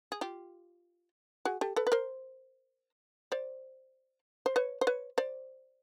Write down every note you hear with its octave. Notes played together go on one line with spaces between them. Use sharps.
G#4
F4 G4
F#4 G#4
G4 A4
A4 B4
B4
A#4 C5
C5 D5
C5
B4 C#5
C5
B4 C#5
C5 D5